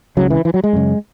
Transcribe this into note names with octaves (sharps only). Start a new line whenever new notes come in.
C#2 C#3 F#3
E3
E3
F#3
G#3
F#2 C#3